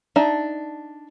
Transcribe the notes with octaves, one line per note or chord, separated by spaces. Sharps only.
D4 D#4 E5 A5